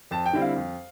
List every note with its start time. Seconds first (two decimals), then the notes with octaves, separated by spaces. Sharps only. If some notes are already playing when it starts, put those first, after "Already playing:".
0.11 F2 A5
0.26 G5
0.33 D3 G3 C4 E4
0.42 F5
0.56 F2